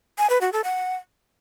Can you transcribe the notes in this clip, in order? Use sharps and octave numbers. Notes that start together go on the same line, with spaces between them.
G#5
B4
F#4
A4
F#5